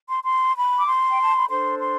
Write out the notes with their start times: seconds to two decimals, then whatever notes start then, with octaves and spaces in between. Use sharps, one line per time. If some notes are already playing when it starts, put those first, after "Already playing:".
0.09 C6
0.24 C6
0.56 B5
0.77 D6
0.86 C6
1.09 G5
1.21 A5
1.35 B5
1.49 D4 A4 C5 C6
1.80 C6